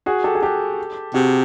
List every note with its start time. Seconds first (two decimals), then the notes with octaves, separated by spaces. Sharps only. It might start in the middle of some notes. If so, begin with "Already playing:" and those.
0.06 F#4 G#4
0.24 G4 A4
0.35 G#4
0.42 G4 A4
1.14 C3 F#4 G#4